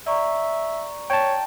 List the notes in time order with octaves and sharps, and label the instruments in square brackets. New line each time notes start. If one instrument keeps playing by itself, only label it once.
[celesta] D5 A#5 C#6 [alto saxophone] E5
[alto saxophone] C#5 [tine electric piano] G5 A5